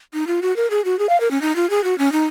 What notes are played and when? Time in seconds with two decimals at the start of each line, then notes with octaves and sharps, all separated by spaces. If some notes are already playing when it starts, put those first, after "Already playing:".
0.14 D#4
0.27 F4
0.42 F#4
0.56 A#4
0.70 G#4
0.85 F#4
0.99 G#4
1.09 F5
1.20 A#4
1.31 C#4
1.42 D#4
1.56 F4
1.70 G#4
1.84 F#4
1.98 C#4
2.12 D#4